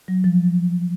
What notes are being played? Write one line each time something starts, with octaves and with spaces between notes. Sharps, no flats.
F#3
F3